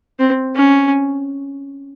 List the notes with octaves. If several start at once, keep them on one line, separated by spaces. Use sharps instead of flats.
C4
C#4